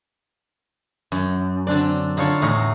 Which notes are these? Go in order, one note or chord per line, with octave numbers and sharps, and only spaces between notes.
F#2
D3 C4 D4 D5
D3 D#4 F4 A4 C#5
E2 A2 D#4 C#5 A#5